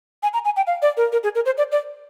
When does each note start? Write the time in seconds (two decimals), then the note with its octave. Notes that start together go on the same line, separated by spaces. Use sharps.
0.23 G#5
0.33 A#5
0.45 G#5
0.57 G5
0.67 F5
0.82 D5
0.97 A#4
1.12 A#4
1.23 G#4
1.35 A#4
1.46 C5
1.58 D5
1.72 D5